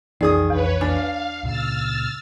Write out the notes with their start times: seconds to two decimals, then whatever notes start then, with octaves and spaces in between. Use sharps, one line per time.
0.21 B1 F2 D#3 E3 G#4 D5 D#6
0.50 E2 B4 C#5
0.81 D4 F5 G#5
1.43 C#2 A#2 C#3 E6 F6 A6